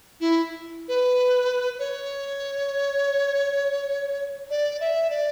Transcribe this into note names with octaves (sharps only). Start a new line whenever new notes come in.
E4
B4
C#5
D5
E5
D5